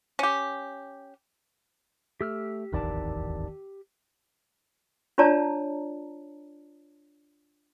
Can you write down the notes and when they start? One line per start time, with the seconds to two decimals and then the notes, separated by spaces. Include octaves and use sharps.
0.19 C#4 G4
2.21 A3 G4 E6 F6
2.73 D1 G#1 E2 D#3 D5 A5
5.18 D4 F4 C#5 D5 A5 A#5